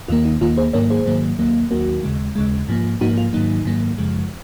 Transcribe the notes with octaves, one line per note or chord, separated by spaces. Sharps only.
D#2 D#3 A#3 F4
D#4
D#2 D#3 A#3 F4
G#4 C5
G#2 D#3 F#3 A#3 A#4 C#5
G#4 C5
G#2 D#3 F#3 A#3
D#2 D#3 F#3 A#3
D#2 D#3 F#3 A#3 F#4 A#4
D#2 C#3 G#3
D#2 C#3 G#3
G#2 F3 A#3
G#2 F3 A#3 D#4 F#4
F4
G#2 D#3 F#3 A#3 D#4
G#2 D#3 F#3 A#3
F#2 C#3 F3 G#3